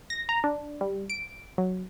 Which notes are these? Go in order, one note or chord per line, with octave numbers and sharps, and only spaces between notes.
A#6
A#5
D4
G3
D7
F#3